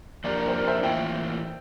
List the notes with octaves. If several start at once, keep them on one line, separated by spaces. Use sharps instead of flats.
F3 A#3 D4 G4 A#4 D5
A#4 D5
C5
A#4 D5
C5 E5
A2 E3 A#3 F4 E5 G5